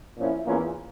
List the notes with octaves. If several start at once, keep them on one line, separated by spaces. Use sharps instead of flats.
A#2 F3 C#4 E4
E2 E3 A#3 C#4 F4